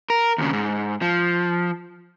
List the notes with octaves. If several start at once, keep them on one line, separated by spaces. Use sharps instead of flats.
A#4
D#2 C#3
G#2
F3